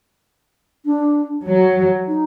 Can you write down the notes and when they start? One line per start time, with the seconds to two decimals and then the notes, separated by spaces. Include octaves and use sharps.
0.85 D4
1.47 F#3
2.07 D#4